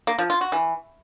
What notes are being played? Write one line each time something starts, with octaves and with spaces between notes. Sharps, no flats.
A#3
F3
F4
F#4
E3